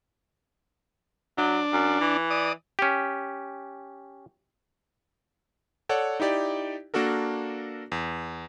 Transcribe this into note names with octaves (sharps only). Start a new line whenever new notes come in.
F#3 D4
F#2
E3
D5 D#6
C#4 G4
A4 C#5 D5 F#5
D#4 E4 G4 D5
A#3 D4 F#4 A4 A#4
E2